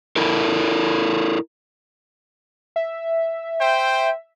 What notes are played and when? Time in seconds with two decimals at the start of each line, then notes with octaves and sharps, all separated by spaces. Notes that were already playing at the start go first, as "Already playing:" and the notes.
0.16 E4 A4 A#4
2.76 E5
3.61 C5 G5